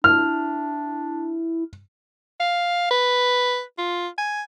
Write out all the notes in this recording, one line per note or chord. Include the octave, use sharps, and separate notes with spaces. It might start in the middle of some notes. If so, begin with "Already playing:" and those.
D4 E4 F6
F5
B4
F4
G#5